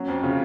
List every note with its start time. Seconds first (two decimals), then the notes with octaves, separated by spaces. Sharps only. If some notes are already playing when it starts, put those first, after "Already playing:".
Already playing: F#3 A#3 C#4
0.08 F2
0.23 C#3 F4